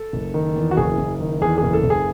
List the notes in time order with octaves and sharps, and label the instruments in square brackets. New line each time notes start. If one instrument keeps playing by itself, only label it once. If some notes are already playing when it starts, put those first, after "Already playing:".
Already playing: [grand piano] A4
F#1
D#3
E2
F#4
F#1 G#4
F#1
D#3
E2 G#4
G#4
F#1
A4
F#1
G#4